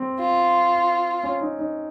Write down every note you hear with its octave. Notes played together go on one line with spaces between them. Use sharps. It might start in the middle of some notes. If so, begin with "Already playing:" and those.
Already playing: C4
F4
C#4
D#4
D#4